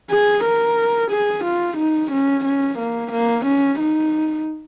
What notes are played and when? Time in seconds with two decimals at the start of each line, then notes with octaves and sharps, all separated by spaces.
0.10 G#4
0.44 A#4
1.11 G#4
1.44 F4
1.77 D#4
2.11 C#4
2.44 C#4
2.78 A#3
3.12 A#3
3.45 C#4
3.79 D#4